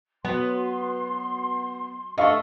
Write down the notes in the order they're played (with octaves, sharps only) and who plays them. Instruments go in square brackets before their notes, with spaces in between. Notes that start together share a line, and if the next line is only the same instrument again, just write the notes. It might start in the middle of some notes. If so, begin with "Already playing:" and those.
[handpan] F#3 [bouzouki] B3 B4 [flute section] C6
[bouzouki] A3 A4 [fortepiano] D#5 F5 C#6